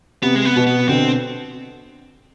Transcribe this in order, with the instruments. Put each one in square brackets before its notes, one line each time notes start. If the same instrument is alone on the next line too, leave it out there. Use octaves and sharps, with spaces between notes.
[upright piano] C3 [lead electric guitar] B3
[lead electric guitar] G#3
B3
[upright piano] B2
[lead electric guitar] B3
[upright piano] B2 D3 [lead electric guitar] C4